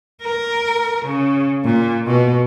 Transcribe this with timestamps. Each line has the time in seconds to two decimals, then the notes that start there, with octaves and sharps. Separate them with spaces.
0.22 A#4
1.05 C#3
1.64 A#2
2.07 B2